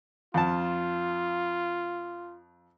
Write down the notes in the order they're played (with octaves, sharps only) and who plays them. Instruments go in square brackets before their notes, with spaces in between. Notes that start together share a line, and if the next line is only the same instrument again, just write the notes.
[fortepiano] F2 A5 [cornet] F4